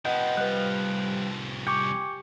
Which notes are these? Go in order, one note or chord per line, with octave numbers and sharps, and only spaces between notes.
C2 F3 B4 D#5 F#5 G5
G3 G4 B4 F5 F#6
G4 G5 G#5 C#6 D6 C#7